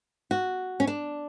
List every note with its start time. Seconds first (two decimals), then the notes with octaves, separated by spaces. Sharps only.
0.31 F#4
0.80 C#4
0.87 D4